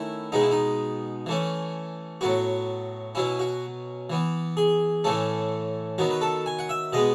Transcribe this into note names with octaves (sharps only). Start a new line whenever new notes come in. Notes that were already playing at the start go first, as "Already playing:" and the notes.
Already playing: D#3 A3 C#4 E4
B2 G#3 B3 D#4
E4
D#4
E3 A3 C#4
A2 F#3 B3 F#4
B2 F#3 C#4 E4
F#4
E3 B3
G#4
A2 E3 A3 C#4 A4
D#3 F#3 B3 F#4
B4
A4
G#5
F#5
E5
B2 G#3 B3 D#5